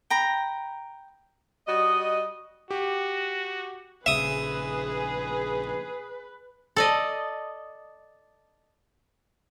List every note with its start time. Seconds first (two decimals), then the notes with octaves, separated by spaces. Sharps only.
0.10 G5 A#5 B5
1.67 G3 F#4 D#5
2.71 F#4 G4
4.06 A#1 C#3 G#4 B4 E5 D#6
6.76 A4 D5 D#5